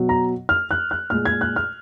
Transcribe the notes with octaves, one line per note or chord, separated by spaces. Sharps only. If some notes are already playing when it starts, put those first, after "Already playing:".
Already playing: B2 F#3
A#5
F6
F#6
F#6
A#2 G#3 F6
G#6
F#6
F6